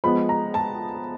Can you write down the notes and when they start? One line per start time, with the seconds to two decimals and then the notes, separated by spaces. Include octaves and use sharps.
0.04 F3 G#3 B3 B5
0.29 A#5
0.54 A5